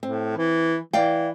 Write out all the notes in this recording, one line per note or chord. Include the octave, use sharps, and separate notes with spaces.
A2 C4
E3
E3 D5 F5 G5